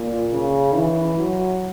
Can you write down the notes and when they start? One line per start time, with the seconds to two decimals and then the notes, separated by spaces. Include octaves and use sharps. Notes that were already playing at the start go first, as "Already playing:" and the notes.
Already playing: A#2
0.31 C#3
0.74 E3
1.18 F#3